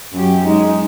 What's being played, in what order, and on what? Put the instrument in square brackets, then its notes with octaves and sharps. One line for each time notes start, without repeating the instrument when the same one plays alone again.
[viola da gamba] F#2 G4
[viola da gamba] G#3 [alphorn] D#4